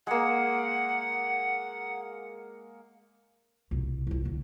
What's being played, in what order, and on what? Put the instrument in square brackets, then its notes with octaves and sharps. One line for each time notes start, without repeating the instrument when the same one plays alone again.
[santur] G#3 A#3 [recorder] F#5
[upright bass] C2 B2
C2 E4
D2 D3